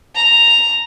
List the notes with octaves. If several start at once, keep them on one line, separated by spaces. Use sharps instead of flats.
A#5